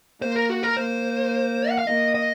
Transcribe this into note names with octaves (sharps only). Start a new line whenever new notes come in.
A#3 C5
A#4
F#4
A#4
A#3 C5
F#5
F5
A#3 D#5
D#5